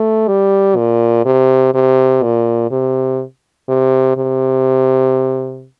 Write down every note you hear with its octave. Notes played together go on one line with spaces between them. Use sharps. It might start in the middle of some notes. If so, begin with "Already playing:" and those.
Already playing: A3
G3
A#2
C3
C3
A#2
C3
C3
C3